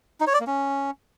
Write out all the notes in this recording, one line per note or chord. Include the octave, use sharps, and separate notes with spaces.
D#4
C#5
D5
A#3
C#4